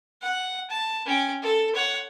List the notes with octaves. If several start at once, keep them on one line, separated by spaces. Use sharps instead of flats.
F#5
A5
C#4 G5
A4
C#5 F#5